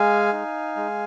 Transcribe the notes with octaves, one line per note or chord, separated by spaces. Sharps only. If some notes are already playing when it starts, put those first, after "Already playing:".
Already playing: G#3 F5 G#5
D#4
G#3